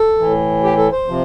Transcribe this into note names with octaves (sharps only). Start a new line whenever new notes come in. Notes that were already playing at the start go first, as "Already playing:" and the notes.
Already playing: A4
A2 E3
G4
A4
C5
C3 F3